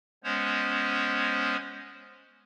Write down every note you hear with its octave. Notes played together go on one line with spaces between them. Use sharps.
G#3 B3 C#4 C5 C#5